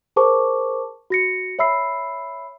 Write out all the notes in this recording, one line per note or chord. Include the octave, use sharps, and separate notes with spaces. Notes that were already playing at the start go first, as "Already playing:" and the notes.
G#4 A#4 C5 A5 C#6 D6
F#4 A#6 C#7
C#5 E5 B5 E6 C7